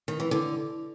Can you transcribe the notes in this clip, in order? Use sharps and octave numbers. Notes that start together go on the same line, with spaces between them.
D#3
E3
D3